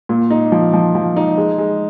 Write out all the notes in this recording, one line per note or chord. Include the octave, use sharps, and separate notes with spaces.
A#2
D#4
F3
F3
F3
D#4
G#3
G#3